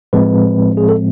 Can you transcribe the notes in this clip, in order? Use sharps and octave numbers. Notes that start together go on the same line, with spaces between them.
A2 F3 G#3 C4 B4
G#4
A4